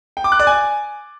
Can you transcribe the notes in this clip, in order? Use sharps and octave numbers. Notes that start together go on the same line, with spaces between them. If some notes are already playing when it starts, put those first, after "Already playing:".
G5
D6
F#6
D5
G#5